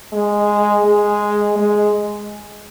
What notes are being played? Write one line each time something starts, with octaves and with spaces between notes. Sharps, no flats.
G#3
G#3
G#3